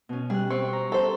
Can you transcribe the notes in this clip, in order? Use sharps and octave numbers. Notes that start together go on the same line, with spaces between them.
B2 C#4
G3 G#4 F#6
C4 C#6
A#5
A4 C5